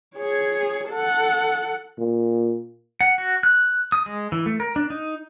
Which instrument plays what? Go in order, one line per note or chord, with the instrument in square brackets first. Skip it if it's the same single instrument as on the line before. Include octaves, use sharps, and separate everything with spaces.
[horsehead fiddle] G#4 C#5
A4 F#5
[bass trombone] A#2
[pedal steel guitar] F#5
F#4
F#6
D#6
G#3
E3
A3
A#4
D4
D#4